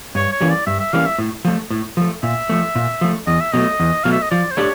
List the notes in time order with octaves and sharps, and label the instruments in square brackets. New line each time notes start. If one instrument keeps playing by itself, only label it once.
[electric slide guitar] G2 [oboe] C#5
[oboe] C#5
[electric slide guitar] E3 G3 A#3 C#4
[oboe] D5
[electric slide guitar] G2 [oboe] E5
[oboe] E5
[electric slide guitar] E3 G3 A#3 C#4 [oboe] F5
[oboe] E5
[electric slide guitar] A2
F3 A3
A2
F3 A3
[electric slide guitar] A#2 [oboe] E5
[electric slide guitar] F3 A3
A#2
F3 A3
[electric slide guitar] E2 [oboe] D#5
[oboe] E5
[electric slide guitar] B2 F#3 A3 [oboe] D#5
[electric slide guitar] E2
[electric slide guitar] B2 F#3 A3 [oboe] F5
[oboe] E5
D#5
[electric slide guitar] F3 [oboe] D5
[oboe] C5
[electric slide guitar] A3 D4 G4 [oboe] C#5